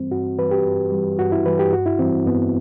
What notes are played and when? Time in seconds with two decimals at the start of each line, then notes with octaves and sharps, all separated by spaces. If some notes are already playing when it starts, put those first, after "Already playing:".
Already playing: G2 E3 G3 C4
0.11 G2 F#4
0.38 E3 G3 B4
0.51 G4
0.65 G2
0.92 E3 G3
1.19 G2 F#4
1.32 E4
1.46 E3 G3 B4
1.59 G4
1.72 G2 F#4
1.86 E4
1.99 E3 G3 C4
2.26 G2 B3